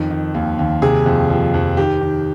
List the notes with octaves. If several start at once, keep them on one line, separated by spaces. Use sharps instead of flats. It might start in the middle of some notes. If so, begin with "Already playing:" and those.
Already playing: F2 D#3
D#3
D#2
D#2
C3 G#4
F2
F3
F2
D#3 G4
D#3